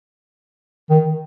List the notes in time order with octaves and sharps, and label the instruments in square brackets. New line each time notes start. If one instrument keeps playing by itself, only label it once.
[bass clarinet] D#3